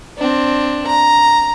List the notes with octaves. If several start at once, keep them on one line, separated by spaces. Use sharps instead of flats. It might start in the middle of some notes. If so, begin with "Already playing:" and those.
C4 D4
A#5